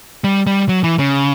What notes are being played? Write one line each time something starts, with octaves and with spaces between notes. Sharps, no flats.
G3
G3
F#3
E3
C#3